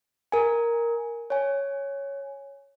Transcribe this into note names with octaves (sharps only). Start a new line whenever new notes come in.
A#4 G#5
C#5 G#5